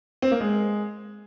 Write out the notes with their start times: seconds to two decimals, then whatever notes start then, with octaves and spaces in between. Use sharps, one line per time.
0.22 C4
0.31 A#3
0.40 G#3